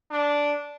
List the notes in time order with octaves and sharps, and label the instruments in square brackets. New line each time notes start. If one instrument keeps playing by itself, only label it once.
[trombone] D4